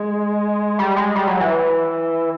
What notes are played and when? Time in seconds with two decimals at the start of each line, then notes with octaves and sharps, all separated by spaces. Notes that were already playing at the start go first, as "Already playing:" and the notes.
Already playing: G#3
0.79 G3
0.97 G#3
1.16 G3
1.27 F#3
1.40 E3